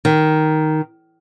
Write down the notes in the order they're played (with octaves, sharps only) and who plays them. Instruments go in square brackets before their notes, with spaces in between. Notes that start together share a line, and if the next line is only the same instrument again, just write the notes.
[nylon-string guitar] D#3